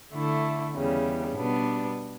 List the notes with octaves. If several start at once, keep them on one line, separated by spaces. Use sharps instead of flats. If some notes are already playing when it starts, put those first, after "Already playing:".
D3 A3 E4
E2 C#3 G3
B2 G3 B3 D4